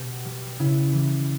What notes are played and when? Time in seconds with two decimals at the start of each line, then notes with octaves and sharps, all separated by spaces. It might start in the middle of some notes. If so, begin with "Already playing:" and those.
Already playing: B2 G4
0.25 G3
0.59 C#3 E4
0.93 E3 G3